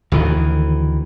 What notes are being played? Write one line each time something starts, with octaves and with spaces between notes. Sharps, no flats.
D2 D#3 E3